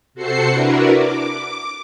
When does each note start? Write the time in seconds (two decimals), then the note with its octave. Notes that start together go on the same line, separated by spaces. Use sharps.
0.14 C3 F#4 A4 C5 C7 C#7
0.50 D4 E4 F#4 A#4 B4
0.94 D6